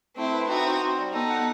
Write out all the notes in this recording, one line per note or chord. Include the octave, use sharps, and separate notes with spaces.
A3 C4 E4
B4
C4 D#4 F#4
C5
C4
G3
B3 D#4 A4
F#5